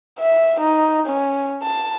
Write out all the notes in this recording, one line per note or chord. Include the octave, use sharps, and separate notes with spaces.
E5
D#4
C#4
A5